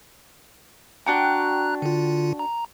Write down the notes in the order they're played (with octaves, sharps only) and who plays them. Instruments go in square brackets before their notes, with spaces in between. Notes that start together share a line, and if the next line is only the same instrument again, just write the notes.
[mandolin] D4 F#4 G5 [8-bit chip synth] A#5 F#6
[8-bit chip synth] D3 F4
A#5